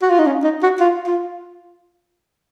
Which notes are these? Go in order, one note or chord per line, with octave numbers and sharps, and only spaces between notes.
F#4
F4
D#4
C#4
D#4
F#4
F4
F4